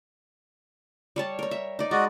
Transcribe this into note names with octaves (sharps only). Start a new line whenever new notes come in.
G3 C#5 A5
A#4 C#5
E5
D#4 D5
G#3 F#4 D5 D#5